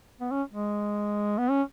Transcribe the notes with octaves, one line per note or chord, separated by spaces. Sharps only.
B3
C#4
G#3
B3
C#4